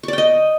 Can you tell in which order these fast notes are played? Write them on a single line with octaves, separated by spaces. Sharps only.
C#6 D5 G5 D#5